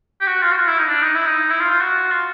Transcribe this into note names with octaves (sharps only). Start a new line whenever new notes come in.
G4
F#4
F4
F#4
F4
E4
D#4
D4
D#4
E4
D#4
E4
F4
F4
F#4
F4